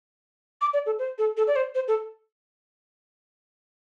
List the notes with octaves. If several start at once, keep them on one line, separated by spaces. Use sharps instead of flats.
D6
D5
A4
C5
A4
A4
D5
C5
C5
A4